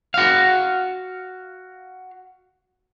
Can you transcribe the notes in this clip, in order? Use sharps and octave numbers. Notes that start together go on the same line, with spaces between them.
F#4 F5